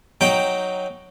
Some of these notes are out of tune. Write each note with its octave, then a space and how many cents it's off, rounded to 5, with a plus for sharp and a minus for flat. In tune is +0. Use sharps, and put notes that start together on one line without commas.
F#3 +0 D#4 +0 G5 +0